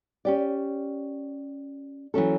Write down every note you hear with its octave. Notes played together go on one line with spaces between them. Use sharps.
C#4 G4 D5
E3 F#3 C#4 A4